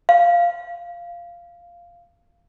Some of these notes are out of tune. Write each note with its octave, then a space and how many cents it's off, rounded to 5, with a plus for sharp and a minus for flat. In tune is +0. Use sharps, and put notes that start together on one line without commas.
F5 -10